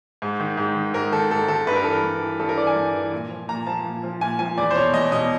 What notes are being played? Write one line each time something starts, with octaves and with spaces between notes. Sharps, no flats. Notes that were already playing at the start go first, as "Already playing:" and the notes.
G#2
D#3
G#2
D#3
G#2 A#4
D#3 A4
G#2 A4
D#3 A4
G2 B4
A#4
E3 A4
A#4
G2
E3
G2 A4
A#4
E3 D5
G#5
G2
E3
A#2
F3
A#2 A#5
F3 A5
A#2
F3
A#2 G#5
F3 G#5
E2 D5
C5
B2 C#5
E2 D#5
B2 D#5